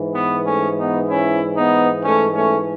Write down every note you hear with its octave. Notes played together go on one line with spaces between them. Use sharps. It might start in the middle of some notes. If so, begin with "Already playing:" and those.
Already playing: G#2 E3
B3
A3 C#4
B3 D#4
C#4 E4
B3 D#4
A3 C#4
A3 C#4